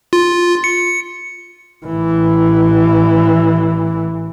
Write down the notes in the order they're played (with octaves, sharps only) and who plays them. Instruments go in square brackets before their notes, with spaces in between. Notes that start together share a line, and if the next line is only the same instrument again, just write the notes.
[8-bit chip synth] F4
C#7
[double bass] A1 E3